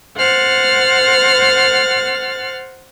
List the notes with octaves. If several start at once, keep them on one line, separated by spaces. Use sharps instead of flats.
C5 F#5 F6 A6